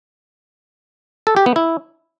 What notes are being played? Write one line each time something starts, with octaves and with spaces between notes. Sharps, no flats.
A4
G4
B3
E4